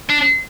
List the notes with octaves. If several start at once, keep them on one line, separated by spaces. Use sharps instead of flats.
D4